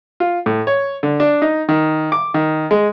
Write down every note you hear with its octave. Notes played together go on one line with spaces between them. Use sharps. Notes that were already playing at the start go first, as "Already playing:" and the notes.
F4
A2
C#5
D3
D4
D#4
D#3
D6
D#3
G#3